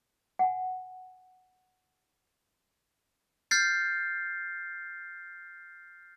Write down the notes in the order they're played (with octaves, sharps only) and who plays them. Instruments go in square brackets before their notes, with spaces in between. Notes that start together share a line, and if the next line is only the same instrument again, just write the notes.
[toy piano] F#5 G#5
[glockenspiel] F6 G6 A6 C7